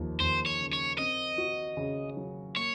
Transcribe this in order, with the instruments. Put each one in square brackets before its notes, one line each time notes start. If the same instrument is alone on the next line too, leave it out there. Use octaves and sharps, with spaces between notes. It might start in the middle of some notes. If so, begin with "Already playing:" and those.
Already playing: [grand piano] D#2 F3
[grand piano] D#2 [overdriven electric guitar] C5
[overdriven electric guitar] C#5
[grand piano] C#3
[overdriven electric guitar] C#5
[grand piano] C4 [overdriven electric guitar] D#5
[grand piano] F#4
C#3
F#3
[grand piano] A#3 [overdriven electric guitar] C#5